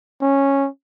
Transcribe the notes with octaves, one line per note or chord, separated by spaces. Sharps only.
C#4